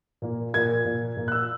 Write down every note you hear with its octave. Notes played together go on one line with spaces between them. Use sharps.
A#2 A#3
A#2 A#3 G#6
A#2 A#3
A#2 A#3
F#6
E6